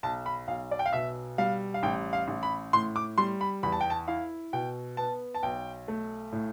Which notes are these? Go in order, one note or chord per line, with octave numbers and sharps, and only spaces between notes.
B1 A5
B5
B1 F5
D5
G5
F5
B2 E5
G3 F5
F5
A1 G5
F5
A1
B5
A2 C6
D6
G3 C6
B5
E2 B5
A5
G5
A5
E4 F5
B2 G5
B3 A5
A5
B1 G5
A3
A2